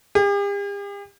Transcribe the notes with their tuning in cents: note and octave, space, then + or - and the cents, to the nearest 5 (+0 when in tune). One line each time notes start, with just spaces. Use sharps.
G4 +45